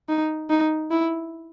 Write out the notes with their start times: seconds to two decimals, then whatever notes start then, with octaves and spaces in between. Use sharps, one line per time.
0.09 D#4
0.50 D#4
0.91 E4